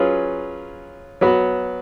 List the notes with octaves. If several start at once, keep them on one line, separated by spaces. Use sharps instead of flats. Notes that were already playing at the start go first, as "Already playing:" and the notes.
Already playing: F#3 C#4 F4 G#4 B4
F#3 B3 F#4